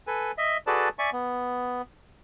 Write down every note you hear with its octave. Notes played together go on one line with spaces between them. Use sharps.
A4 B4 G#5
D#5 E5
F#4 G#4 A4 B4 D5 A5
D5 E5 G#5 C#6
B3